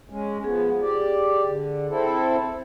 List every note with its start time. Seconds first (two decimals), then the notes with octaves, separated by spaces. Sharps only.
0.10 G#3 C#4
0.44 F3 B3 G#4
0.81 G4 D5
1.46 D3
1.89 C4 E4 A4